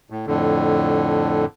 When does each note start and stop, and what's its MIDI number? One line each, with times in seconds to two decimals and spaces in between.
0.10 0.25 45
0.27 1.45 41
0.27 1.45 45
0.27 1.45 50